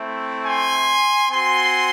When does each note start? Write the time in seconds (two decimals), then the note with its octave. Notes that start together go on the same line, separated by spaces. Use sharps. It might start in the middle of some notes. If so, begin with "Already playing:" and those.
Already playing: A3 C4 E4
0.45 G#5 C6
1.30 C4 F#4 G#5 C6